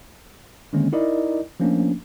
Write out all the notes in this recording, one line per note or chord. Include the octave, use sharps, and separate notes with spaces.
D3 D#3 G#3 A#3 C4 C#4
D#4 E4 A#4 D5 D#5
F3 A3 A#3 C#4 D4